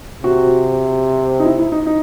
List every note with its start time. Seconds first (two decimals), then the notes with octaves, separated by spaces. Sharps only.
0.23 C3 F#4
1.40 D#4
1.45 E4
1.59 E4
1.72 D#4
1.86 D#4